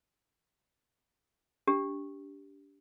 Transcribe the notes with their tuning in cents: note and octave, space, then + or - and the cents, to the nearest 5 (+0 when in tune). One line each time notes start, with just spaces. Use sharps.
D4 -25 G4 +0